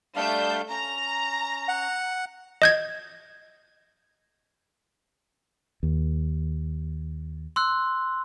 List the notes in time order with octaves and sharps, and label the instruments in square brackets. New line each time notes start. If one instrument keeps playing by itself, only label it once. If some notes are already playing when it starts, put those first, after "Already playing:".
[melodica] G3 D4 F5 [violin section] A3 G6
[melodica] C#4 [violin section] A#5
[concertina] F#5
[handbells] D#5 G6 G#6
[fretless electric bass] D#2
[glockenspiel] C6 E6 F#6